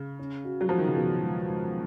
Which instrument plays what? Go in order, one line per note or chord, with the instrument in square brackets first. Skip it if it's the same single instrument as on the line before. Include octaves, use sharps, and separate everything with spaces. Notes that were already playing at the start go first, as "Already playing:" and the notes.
Already playing: [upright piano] C#3
[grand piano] C#4
F#4
[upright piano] F#3
[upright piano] F3 [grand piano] F#4
[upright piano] D#3
C#3
[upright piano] B2 [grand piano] F3
[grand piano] G#3
G#3